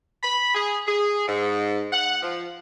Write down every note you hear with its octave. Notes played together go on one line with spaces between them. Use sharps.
B5
G#4
G#4
G#2
F#5
F3